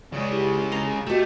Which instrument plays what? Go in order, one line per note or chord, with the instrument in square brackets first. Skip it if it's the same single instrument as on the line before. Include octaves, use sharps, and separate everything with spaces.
[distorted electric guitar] C#3 G#3 [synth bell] D5 C#6
[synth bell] E4 G4 G#4
[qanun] A#5 C6
[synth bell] G#4
[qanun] B2 G4 [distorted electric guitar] A3